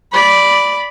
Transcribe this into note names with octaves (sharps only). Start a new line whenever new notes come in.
D5 B5